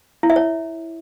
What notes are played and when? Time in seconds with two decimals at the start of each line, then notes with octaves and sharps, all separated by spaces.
0.23 E4
0.30 E5
0.36 C#5